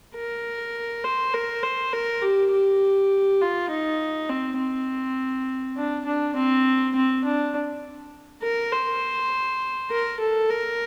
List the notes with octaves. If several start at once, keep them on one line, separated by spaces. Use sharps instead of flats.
A#4
C5
A#4
C5
A#4
G4
G4
F4
D#4
C4
C4
D4
D4
C4
C4
D4
A#4
C5
A#4
A4
A#4